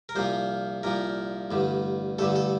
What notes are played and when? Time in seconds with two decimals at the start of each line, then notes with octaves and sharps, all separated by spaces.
0.09 A#4
0.15 C2 A#2 F3 C5
0.83 C2 A#2 F3 A#4
1.51 A1 G2 D3
2.19 A1 G2 D3 A4
2.36 A4